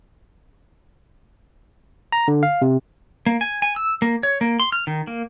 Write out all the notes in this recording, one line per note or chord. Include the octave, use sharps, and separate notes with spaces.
A#5
D3
F5
C3
A#3
G#5
G#5
E6
A#3
C#5
A#3
C6
F6
D#3
A#3